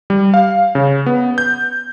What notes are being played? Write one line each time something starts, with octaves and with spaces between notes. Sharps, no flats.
G3
F5
C#3
B3
G6